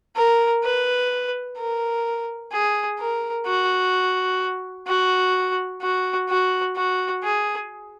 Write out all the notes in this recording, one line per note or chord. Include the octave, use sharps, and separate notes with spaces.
A#4
B4
A#4
G#4
A#4
F#4
F#4
F#4
F#4
F#4
G#4